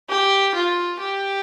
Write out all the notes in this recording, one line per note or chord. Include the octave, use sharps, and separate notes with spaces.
G4
F4
G4